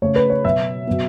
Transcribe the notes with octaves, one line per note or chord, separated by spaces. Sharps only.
C#3 A3 C#5
B4
C#5
B2 F#3 B3 E5
B2 F#3 B3